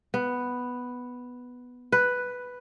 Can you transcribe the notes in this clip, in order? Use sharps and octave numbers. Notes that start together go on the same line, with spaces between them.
B3
B4